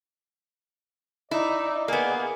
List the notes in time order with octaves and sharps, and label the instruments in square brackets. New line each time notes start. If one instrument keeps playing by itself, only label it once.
[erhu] D#4 [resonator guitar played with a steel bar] E4 [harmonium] D5 D#5
[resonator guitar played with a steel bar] A#3 B3 [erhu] G#4